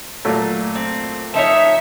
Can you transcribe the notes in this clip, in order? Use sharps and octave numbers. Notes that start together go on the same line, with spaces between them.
A#2 F#3 A3
C4
F3 D#4 C#5 E5